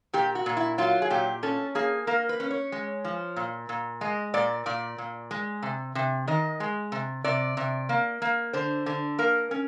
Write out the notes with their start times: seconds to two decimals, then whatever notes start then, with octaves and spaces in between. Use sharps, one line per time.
0.13 A#2 G4
0.35 F#4
0.46 A#2
0.57 E4
0.78 F#3 F4
1.02 G#4
1.10 A#2 G4
1.43 C#4 A4
1.75 A#3 G#4
2.07 A#3 A#4
2.29 B4
2.40 C#4
2.51 C#5
2.72 G#3
3.05 F3
3.36 A#2
3.69 A#2
4.01 G#3 D#5
4.34 A#2 D5
4.66 A#2 D5
4.98 A#2
5.31 G#3
5.63 C3
5.95 C3
6.27 D#3 D#5
6.60 G#3
6.92 C3
7.24 C3 D5
7.57 C3
7.89 A#3
8.22 A#3
8.53 D3 C5
8.86 D3
9.18 A#3 A#4
9.51 C#4